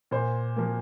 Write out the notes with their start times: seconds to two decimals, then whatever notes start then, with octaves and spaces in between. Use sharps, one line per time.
0.11 A#2 C5
0.56 F3 A#3